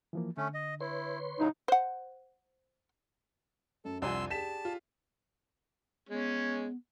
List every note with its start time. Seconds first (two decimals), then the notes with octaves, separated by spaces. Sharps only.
0.13 E3 F3 A#3
0.37 D3 A3 C#4
0.54 D#5
0.80 E4 B4 C#5 C6
1.39 A2 C#3 F#3 D#4
1.68 C5 F#5
3.85 F#2 A4
4.02 C2 F2 D4 F#5 G#5 C6 E6 G7
4.30 G4 G#4 A5 B6 E7
4.65 F4
6.09 G#3 B3 C#4